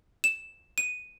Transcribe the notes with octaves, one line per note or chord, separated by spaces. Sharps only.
E7
D#7